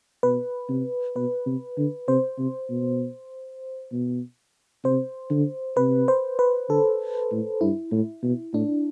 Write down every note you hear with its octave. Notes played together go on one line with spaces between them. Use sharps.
B2 B4
C3
B2 B4
C3
D3
C3 C5
C3
B2
B2
C3 C5
D3
C3 B4
C5
B4
D3 A4
A2
G2 E4
A2
B2
A2 D4